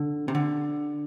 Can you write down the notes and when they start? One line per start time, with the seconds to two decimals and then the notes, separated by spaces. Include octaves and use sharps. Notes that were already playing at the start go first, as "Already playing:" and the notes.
Already playing: D3
0.28 C3
0.35 D3